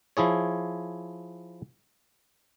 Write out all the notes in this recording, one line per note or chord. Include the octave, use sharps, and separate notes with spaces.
F3 E4 G#4 C#5